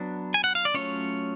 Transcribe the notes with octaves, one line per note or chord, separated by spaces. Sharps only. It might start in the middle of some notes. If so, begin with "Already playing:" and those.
Already playing: F#3 B3 D4
G#5
F#5
F5
D5
F#3 A3 C#4 F4 C#5